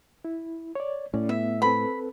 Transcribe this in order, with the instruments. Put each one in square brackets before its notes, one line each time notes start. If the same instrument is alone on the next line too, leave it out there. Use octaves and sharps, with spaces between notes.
[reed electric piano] E4
C#5 D5
[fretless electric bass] A2 [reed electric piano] C#4 D5
[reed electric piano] B3 [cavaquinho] E5
[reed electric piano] C4 A4 B4 [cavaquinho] B5